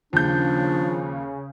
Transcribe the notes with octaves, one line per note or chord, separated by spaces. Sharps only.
D#2 C#3 F3 D4 G6